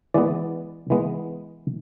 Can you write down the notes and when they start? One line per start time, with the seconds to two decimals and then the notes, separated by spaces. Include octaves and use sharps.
0.14 E3 G#3 B3 D5
0.90 E3 G#3 B3